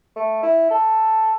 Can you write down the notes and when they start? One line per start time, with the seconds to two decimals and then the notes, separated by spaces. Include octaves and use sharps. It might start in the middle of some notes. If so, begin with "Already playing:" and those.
0.16 A3
0.43 E4
0.70 A4